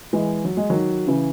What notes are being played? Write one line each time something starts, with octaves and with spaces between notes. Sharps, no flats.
E3 G#3
F#3
G#3
D#3 F#3
C#3 E3